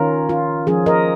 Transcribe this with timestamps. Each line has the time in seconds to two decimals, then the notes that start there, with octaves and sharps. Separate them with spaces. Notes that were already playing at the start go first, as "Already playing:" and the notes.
Already playing: D#3 C#4 F4 A#4
0.29 F4
0.67 F3 C#4 F4 G#4
0.86 A#4 D#5